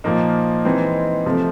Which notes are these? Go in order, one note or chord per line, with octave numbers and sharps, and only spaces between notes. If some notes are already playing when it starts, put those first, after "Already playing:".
A#2 F3 A#3 D#4
E3 G#3 C4 D#4
C3 F3 A3